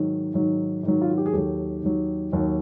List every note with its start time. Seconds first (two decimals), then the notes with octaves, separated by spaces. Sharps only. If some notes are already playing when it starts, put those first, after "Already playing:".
Already playing: G#2 D#3 F#3
0.34 G#2 D#3 F#3
0.83 G#2 D#3 F#3
1.01 F4
1.09 F#4
1.18 G4
1.26 G#4
1.33 D#2 D#3 F#3 G4 A4
1.83 D#2 D#3 F#3
2.32 D#2 D#3 F#3